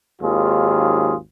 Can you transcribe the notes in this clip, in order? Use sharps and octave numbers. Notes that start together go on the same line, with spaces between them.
G#1 D#2 F4 G#4